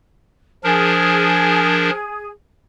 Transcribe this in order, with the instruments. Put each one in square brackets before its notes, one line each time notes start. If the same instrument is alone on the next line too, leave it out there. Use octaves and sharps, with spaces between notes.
[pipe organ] F3 D4 A#4 [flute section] G#4